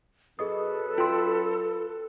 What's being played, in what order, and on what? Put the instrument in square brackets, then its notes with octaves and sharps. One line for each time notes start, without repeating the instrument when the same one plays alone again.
[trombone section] F#2 B4 [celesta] G#4 D#5 D#6 [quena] A4
[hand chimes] F4 E6 [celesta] G5 C6